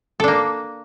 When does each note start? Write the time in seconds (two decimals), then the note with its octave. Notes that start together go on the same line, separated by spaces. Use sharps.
0.20 A4
0.24 D4
0.28 A#3